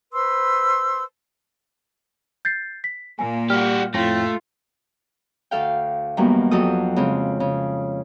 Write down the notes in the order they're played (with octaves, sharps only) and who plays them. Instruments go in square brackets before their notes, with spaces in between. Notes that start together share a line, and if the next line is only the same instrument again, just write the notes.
[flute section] B4 C5 C6 E6
[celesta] G6 A6 C7
B6
[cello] A#2 A#3 [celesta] G#5
[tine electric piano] G3 [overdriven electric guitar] F#4 G4 [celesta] F6
[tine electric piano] F2 A2 G5 [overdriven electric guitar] A3 [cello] F4 [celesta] A#6
[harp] D2 A4 F5 G5
F#2 D#3 G3 A#3 B3
F2 F#3 G4 A4 D#6
C#3 G#3 C4
C#3